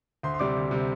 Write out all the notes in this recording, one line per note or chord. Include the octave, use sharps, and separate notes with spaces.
D2 C5 C6
C6
C3 G3 C4 D5 D6
D2
C3 G3 C4